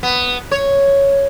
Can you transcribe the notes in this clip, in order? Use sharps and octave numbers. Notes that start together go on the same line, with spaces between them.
B3
C#5